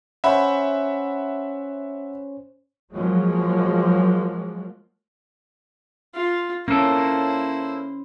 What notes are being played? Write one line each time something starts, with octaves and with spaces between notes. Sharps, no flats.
C#4 C5 C#5 E5 F#5 B5
F3 F#3 G#3 A#3
F4
A#3 C#4 E4 A4 C5